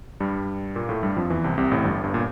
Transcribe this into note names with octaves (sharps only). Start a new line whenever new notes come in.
G2 G3
A#2 A#3
A2 A3
G2 G3
F2 F3
E2 E3
C2 C3
C2 C3
A1 A2
G1 G2
G1 G2
A#2